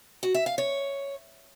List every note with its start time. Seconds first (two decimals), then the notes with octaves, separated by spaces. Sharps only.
0.23 F#4
0.34 E5
0.46 F5
0.58 C#5